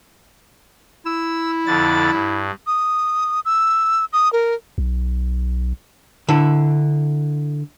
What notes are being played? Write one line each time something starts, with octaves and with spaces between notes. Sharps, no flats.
E4 E6
F2 D3 A6
G2
D#6
E6
D#6
A#4
B1
D3 E4